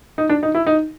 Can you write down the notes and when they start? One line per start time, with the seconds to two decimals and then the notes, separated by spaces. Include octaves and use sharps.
0.18 D#4
0.29 D4
0.43 D#4
0.55 E4
0.66 D#4